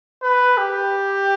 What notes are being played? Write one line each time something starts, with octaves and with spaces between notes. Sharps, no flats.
B4
G4